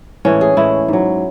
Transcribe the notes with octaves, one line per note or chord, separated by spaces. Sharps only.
A2 E3 G#3 C#4
G#4
A2 E3 G#3 E4
G#2 F#3